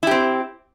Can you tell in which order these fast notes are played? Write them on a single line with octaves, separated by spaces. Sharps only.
E4 G4 C4